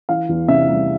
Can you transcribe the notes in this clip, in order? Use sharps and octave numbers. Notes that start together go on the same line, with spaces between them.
E3 F5
E2
C3 E5
G3